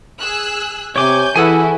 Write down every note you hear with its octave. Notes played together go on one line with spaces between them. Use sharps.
G#4 E6 F#6
C3 C#5 G#5 D6 G6
E3 E4 F#4 G#4 A4 F#5 G#5 E6